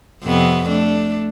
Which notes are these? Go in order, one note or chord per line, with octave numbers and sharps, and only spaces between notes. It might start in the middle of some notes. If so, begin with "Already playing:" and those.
F2 C3 B3
A3 D4